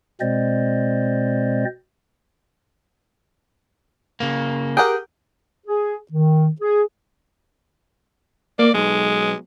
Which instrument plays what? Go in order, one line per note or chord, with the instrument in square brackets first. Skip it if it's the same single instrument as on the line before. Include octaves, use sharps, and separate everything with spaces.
[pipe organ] B2 G#3 C4 C5 D5 D#5
[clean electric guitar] C#3 A#3
[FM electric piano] G4 A#4 G5 [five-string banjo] G#4 F#5
[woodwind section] G#4
D#3
G#4
[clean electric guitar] A#3 [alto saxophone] D5
[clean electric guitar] B1 [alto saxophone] G#3